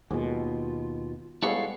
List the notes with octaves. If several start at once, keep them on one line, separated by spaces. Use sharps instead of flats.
D#2 B2 G#3 F4
G3 G#3 B3 E4 A4 C#5 F5